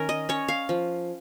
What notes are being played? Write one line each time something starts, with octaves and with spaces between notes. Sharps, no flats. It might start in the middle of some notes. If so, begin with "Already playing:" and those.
Already playing: D#3 C#4 A#4
D#5
C#4 C#5
F5
F3